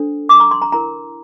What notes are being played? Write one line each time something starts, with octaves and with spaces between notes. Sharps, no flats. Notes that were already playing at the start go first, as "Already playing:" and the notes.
Already playing: D4 A4 C5
D6
A#5
C6
A#5
E4 A#4 A#5